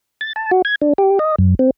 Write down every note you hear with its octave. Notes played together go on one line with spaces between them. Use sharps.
A6
A5
F#4
G#6
D4
G4
D#5
F#2
C4